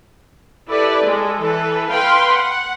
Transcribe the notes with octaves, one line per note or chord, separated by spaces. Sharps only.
E4 G4 A4 B4 D5
G#3 A4
E3 A4 B4
B4 F5 G5 B5 C6
F#5